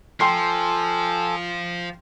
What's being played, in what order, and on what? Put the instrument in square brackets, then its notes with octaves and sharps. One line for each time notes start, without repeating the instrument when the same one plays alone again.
[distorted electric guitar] F3 [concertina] A4 G#5 [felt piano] G5 C6 C7